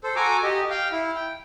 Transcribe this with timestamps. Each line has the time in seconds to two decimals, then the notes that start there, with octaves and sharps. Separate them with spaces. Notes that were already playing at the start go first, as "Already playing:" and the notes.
0.04 A4 C5
0.16 F#4 A4 G#5 A#5 D6
0.43 G4 D#5
0.70 F5 G5
0.92 E4
1.15 G5